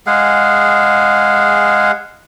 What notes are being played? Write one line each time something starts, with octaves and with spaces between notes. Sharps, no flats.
G#3 G#4 F5 F#5